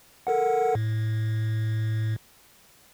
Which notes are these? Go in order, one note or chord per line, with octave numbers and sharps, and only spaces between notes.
A4 A#4 F#5
A2